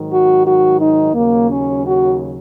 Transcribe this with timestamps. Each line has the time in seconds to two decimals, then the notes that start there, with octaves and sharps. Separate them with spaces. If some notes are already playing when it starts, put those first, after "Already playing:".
Already playing: G#2 D#3 F#3
0.10 F#4
0.45 F#4
0.79 D#4
1.14 D#2 C#3 F#3 A#3
1.48 C#4
1.84 F#4